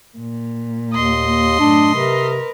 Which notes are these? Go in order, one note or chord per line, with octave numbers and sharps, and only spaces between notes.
A#2
D#2 D#5 C6
F#2 A2 D4
C3 A#4 B4